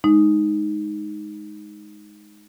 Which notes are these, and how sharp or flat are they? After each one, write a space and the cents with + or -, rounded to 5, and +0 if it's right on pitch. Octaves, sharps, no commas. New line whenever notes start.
G#3 +10 D#4 +0